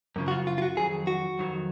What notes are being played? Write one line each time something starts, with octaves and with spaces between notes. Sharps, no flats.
F#2 C#3 F3
F#4
F4
F4
F4
F#4
F2 D#3 F#3 G#4
F#4
F2 D#3 F#3